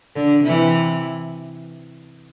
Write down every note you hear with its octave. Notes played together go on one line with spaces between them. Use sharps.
D3
C3 E3